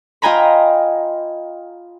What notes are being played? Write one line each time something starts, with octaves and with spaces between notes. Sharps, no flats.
F4 D#5 G5 G#5 A#5 B5